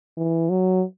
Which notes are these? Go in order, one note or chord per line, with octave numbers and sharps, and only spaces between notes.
E3
F#3